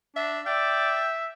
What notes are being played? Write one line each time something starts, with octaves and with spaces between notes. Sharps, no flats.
D4 E5
D5 E5 G5